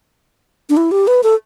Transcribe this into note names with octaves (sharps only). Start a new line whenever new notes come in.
D4
E4
G4
B4
A4